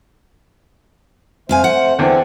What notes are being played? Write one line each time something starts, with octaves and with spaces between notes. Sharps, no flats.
F2 A3 C5 F5 G#5
F#5
E2 D3 C4